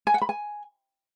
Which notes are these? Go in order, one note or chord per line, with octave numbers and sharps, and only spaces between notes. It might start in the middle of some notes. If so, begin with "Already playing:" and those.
G#5
F#5
B5
G#5